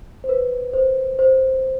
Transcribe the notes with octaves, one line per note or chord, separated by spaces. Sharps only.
C5
B4
C5
C5